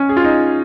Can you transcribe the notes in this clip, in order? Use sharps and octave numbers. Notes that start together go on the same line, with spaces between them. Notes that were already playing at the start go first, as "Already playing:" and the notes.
Already playing: C#4
G#4
F4
D#4